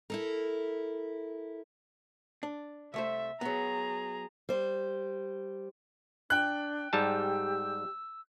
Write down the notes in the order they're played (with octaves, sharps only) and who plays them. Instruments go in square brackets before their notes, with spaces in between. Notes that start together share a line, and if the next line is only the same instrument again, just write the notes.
[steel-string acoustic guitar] E4 A4 A#4
[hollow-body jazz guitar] D4
[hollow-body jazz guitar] C2 A3 C5 [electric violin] E5
[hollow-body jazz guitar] F#3 B3 [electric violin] G#4 A#5
[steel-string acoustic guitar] G3 C5
[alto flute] D4 [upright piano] G5 F#6
[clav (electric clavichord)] G#2 G3 A5 [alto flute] G4 [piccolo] E6